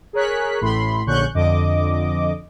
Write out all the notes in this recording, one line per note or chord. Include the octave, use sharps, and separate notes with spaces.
G#4 A#4 C#5 F#6 B6
A1 A2 B5 C6
A#1 D3 C#4 C#6 F#6 G6
F2 D3 D#5 D6